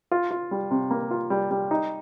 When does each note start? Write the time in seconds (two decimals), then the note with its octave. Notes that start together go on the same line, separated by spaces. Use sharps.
0.11 F4
0.31 F4
0.51 G3
0.71 C3
0.91 A#3
1.11 F4
1.30 G3
1.51 G3
1.71 D#4